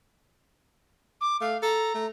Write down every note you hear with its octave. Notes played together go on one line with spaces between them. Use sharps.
D6
A3 F5
A4 A#5
A3